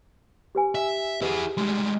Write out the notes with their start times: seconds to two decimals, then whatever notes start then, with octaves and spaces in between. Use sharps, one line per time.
0.55 G4 B4 G#5
0.75 E5
1.22 E4 G4 G#4 B4
1.57 G3 G#3 D#4 C6